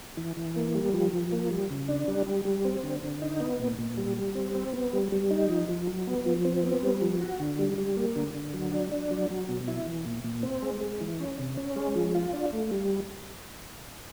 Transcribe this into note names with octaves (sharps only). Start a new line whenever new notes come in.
E3
E3
A#3
G3
F3
F3
A#3
G3
C#3
D4
G3
G3
G3
C4
D3
D3
D#4
B3
A#2
A#2
G3
G3
C4
C4
B3
G3
G3
D#4
F3
F3
F#3
B3
F3
C4
B3
G3
F3
F#4
D3
G3
G3
A#3
D3
D3
F#3
D4
D4
F#3
F#3
B2
E4
E3
A#2
A#2
C4
G#3
G#3
E3
C#4
C3
C#4
G#3
F3
F4
D4
A3
G3